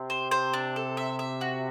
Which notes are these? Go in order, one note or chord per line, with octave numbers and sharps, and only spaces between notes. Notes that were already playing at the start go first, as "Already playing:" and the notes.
Already playing: C3 C4
C5
C5
D4
A4
E5
E5
F#4